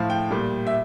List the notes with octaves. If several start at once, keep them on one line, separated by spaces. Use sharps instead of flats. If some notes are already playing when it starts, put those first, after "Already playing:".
Already playing: A2 F3 F5
G5
A#2 G3
E5